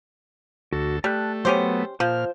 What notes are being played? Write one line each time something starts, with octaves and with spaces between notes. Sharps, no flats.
D2 F#4 A4
G3 A3 A5 F#6
F#3 B3 C#4 G4 C5
A#2 F3 C5 F6